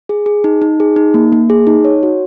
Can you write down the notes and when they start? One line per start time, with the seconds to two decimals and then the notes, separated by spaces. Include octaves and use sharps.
0.09 G#4
0.26 G#4
0.44 D#4
0.62 D#4
0.80 G#4
0.96 D#4
1.14 A#3
1.32 A#3
1.50 G#4
1.67 D#4
1.85 C#5
2.03 F#4